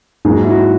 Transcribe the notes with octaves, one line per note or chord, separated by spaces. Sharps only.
G#2 F#3 A#3 G#4
F#4
E4
F#4